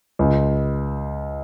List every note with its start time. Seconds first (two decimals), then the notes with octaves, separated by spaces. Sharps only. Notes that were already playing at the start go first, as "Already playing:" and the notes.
0.19 C#2